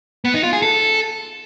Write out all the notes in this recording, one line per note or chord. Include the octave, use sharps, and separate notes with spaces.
B3
D#4
F4
G#4
A4